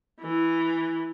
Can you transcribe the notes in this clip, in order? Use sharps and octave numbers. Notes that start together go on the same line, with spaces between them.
E3